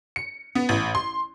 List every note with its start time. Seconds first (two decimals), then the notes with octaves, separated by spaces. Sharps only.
0.16 C#7
0.55 B3
0.69 A1
0.95 C6